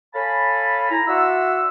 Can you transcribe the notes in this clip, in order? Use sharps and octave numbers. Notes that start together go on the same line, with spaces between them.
A4 C#5 F5 G#5 A5 B5
E4 A#5
F#4 D5 E5 F#5 C6 E6